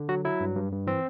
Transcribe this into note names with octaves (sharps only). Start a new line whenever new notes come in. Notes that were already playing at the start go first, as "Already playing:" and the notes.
Already playing: D3
F#3 F#4
F#3 E4
G2
G2
G2
E3 C4